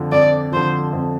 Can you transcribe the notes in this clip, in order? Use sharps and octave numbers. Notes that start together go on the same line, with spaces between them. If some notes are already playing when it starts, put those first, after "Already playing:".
Already playing: F2 D3 F3
F2 D5
D3 F3 C5
F2